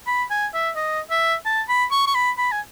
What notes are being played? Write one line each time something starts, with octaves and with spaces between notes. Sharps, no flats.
B5
G#5
E5
D#5
E5
A5
B5
C#6
C#6
B5
B5
G#5